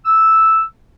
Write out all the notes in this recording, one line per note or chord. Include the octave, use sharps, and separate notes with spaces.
E6